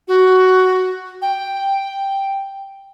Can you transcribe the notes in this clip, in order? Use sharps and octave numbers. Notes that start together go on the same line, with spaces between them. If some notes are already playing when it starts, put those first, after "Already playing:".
F#4
G5